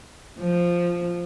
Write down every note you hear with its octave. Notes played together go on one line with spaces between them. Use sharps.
F3